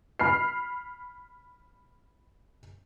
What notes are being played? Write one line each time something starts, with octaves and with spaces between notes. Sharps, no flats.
B5 F6 C7